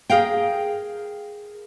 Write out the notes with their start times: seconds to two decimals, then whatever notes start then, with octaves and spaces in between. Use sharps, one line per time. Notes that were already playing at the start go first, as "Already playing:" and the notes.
0.10 G#4 A#4 F5 G5